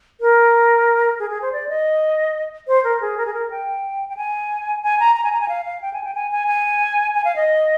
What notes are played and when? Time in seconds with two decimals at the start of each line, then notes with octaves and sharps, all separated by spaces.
0.21 A#4
1.20 G#4
1.30 G#4
1.42 C5
1.52 D5
1.69 D#5
2.68 C5
2.84 A#4
3.01 G#4
3.18 A#4
3.26 G#4
3.34 A#4
3.51 G5
4.09 G5
4.17 G#5
4.83 G#5
5.00 A#5
5.16 A#5
5.24 G#5
5.32 A#5
5.41 G#5
5.49 F5
5.65 F5
5.82 G5
5.93 G#5
6.04 G5
6.15 G#5
6.31 G#5
6.48 G#5
7.14 G#5
7.25 F5
7.36 D#5